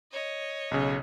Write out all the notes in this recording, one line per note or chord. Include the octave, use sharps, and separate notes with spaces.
C#5 D#5
B1 C#3